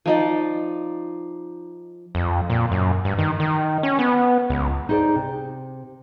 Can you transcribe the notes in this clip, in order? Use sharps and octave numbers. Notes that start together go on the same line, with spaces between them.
F3 D#4 D5
F2
A#2
F#2
G2
D#3
D#3
C#4
B3
C#2
D#4 E4 G#4 C5 D5
C3